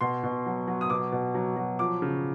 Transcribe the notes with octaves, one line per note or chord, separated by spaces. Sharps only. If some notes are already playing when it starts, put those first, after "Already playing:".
B2 C6
B2
F#3
F#3
D#6
B2 D6
B2
F#3
F#3
F3 D6
C#3